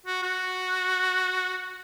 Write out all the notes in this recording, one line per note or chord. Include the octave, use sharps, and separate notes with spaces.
F#4
F#4